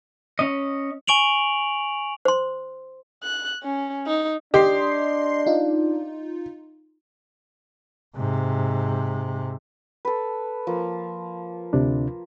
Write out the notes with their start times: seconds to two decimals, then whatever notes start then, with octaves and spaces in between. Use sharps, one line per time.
0.39 C#4 D#5
1.07 G#5 C#6 D7 F7 F#7
2.25 C5 C6
3.24 F#6
3.63 C#4
4.07 D#4
4.54 D4 G4 D#5 C6 C7
5.47 D#4 F4
8.16 G#2 C3
10.05 A4 B4
10.67 F3 A#3
11.73 D2 C3 D4